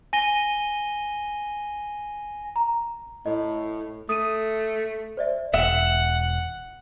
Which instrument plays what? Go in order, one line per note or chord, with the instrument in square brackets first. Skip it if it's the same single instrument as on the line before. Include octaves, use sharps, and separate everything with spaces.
[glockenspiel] G#5 A#6 D#7 G7
[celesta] A#5
[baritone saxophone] A2 [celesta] D#5
[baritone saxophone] A3 [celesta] D#6 D#7
[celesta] C5 D5 E5
[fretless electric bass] E1 [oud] E5 [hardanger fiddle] F#5